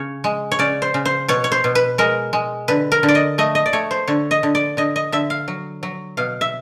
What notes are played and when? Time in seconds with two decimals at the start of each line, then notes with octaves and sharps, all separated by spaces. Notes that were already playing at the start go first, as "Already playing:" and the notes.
Already playing: C#3 C#5
0.24 G#3
0.52 C#5
0.59 C#3 D5
0.82 C5
0.94 C#3
1.05 C5
1.28 B2 C#5
1.44 C#5
1.52 C5
1.64 B2
1.75 B4
1.98 G#3 A#4
2.33 G#3
2.68 D3 B4
2.92 A#4
3.03 D3
3.08 D5
3.15 D#5
3.38 A3 D#5
3.55 D#5
3.66 D5
3.73 A3 C#5
3.91 C5
4.07 D3 C#5
4.31 D#5
4.43 D3
4.55 D5
4.77 D3 D#5
4.96 D#5
5.12 D3 E5
5.30 F5
5.48 F#3
5.83 F#3
6.17 B2 F5
6.41 E5